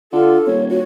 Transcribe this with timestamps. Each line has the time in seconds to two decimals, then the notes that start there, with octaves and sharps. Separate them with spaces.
0.12 D3 F4 A4
0.46 D#1 C#5
0.70 F#4 C#5